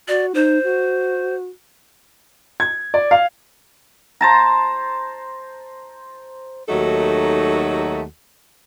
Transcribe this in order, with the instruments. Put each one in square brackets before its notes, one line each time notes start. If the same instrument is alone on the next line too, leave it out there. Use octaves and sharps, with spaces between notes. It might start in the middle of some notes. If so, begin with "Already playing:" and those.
[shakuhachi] F#4 [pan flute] D5
[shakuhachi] D#4 [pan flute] C5
[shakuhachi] F#4
[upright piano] G#6
D5
F5
[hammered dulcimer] C5 A5 A#5
[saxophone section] D#2 F#3 A3 D#4 F#4 A4